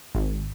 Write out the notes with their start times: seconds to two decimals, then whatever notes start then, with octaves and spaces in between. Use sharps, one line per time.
0.15 G#1